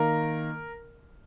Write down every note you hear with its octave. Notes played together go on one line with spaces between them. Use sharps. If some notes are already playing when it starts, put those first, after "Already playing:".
Already playing: D#3 A#3 A#4